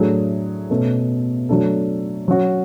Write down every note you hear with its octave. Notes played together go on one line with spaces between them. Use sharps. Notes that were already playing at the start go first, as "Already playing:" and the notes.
Already playing: A2 F#3 A3 D4 G#4
B2 A3 C#4
F#3 A3 D4 A4
F#3 C#4 F#4